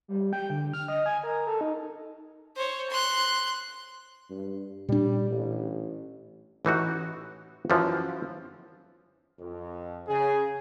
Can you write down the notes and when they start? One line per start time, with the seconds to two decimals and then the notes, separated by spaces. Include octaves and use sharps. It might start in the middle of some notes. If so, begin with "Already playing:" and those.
0.08 G3
0.33 G5
0.50 D3
0.73 F6
0.88 D#5
1.06 G#5
1.23 A#4
1.47 A4
1.61 D#4
2.56 C5 C#5
2.90 C6 F#6
4.31 G2
4.89 A#2 G3 D4
5.30 A1
6.65 A1 E3 D#4 F#4
7.70 F#2 E3 F3
9.40 F2
10.07 C#3 G#4